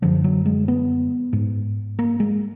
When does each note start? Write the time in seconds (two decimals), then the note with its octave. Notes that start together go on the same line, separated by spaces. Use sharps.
0.02 F#2 D3 F3
0.24 F#3
0.45 G#3
0.68 B3
1.33 G#2
1.99 A#3
2.20 G#3